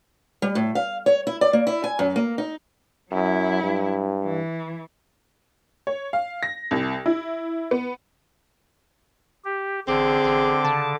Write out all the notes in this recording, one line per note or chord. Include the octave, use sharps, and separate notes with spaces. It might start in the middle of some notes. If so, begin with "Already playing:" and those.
G3
A2
F5
C#5
E4
D5
A#3
E4
G#5
F#2
A#3
D#4
F#2 F#3 E4
G2
E3
C#5
F5
A#6
C2
E4
B3
G4
A1 D3 C4 G#4 D6
A1
C#3 A5